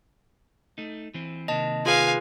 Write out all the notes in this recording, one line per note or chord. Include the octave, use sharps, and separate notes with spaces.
A3 D#4
E3 C4
C3 D#3 A#3 D#5 A5
F4 G#4 B4 F5 G#5